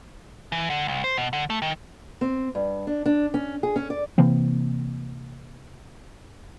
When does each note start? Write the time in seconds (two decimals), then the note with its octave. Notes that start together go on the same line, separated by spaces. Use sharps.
0.52 E3
0.70 D3
0.88 C2
1.04 C5
1.17 B2
1.33 D3
1.50 A3
1.62 D#3
2.21 C4
2.55 G2
2.87 D4
3.06 D4
3.34 C#4
3.63 G#4
3.76 C#4
3.90 D5
4.18 C3 E3 A#3 C4